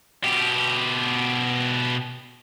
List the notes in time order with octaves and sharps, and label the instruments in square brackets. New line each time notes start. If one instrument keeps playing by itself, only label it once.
[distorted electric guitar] B2 G4